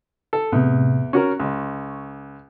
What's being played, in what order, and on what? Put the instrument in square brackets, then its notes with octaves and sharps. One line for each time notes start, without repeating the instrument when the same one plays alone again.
[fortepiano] A4
[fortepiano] E2 [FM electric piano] A2 C3
[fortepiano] C#4 F#4 A#4 [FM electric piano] C#6
[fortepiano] C#2